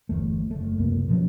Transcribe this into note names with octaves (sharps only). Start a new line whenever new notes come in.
G1 E2 A3
F#1 A3
C#2 F#2 C3 A#3
B2 F3 F#3 C#4